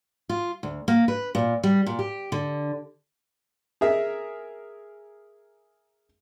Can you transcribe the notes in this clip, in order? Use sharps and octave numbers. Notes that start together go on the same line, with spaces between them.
F4
D2
A#3
B4
A#2
G3
A#2
G4
D3
G#4 A#4 E5